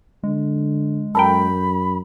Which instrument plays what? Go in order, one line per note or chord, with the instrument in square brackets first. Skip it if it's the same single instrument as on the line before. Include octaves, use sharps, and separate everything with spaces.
[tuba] D3 [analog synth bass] G#3
[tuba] F#2 [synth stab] A4 A#4 G5 [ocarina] B5